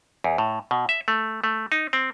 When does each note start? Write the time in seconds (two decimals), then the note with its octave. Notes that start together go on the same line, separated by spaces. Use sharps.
0.24 E2
0.38 A2
0.71 B2
0.89 E5
1.08 A3
1.44 A3
1.72 D#4
1.93 C4